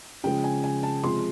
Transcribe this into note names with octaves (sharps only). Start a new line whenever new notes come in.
C#3 F3 G#3 G5
G#5
G#5
A5
C3 F3 G#3 C6